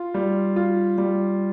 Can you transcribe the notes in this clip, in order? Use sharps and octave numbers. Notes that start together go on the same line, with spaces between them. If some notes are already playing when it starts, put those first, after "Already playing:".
Already playing: F4
G3
F4
G3